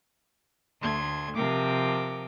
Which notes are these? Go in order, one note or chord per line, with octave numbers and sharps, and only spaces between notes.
D2 A3 C6 G#6
C3 F3 A#4 G5 D6